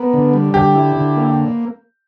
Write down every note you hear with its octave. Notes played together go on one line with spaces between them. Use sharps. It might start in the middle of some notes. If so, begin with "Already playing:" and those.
Already playing: B3 A#4
D3
G3
D3 G4
E4
D3
A#3